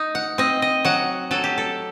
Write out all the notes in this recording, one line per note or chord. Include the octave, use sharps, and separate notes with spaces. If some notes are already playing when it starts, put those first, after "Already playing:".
Already playing: D#4
F#5
C4 D#5
D#5
F#3 F#5
F#3 A4
G4
A4